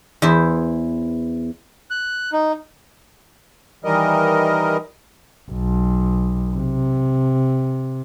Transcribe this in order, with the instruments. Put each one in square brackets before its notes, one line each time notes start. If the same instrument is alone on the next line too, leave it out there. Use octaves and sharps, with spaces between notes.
[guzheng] E2 E4 C5
[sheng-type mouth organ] F#6
D#4
[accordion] D#3 E3 G3 A#4 D#5
[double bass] B1
C3